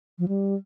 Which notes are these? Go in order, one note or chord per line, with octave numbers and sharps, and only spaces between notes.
F3
G3